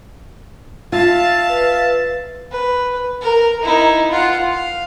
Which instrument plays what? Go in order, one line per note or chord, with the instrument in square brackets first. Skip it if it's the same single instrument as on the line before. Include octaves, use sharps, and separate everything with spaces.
[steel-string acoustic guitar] F4 [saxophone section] E5 F5 [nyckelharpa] A5
[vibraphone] B4
[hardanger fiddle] B4
A#4
D#4 E4
F4 F#5
F5